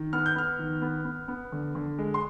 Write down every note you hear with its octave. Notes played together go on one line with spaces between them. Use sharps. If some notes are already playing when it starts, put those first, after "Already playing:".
Already playing: D#3
B3 F6
G6
B3 F6
D#3
B3
B3
B3
D3
D3
G#3
C6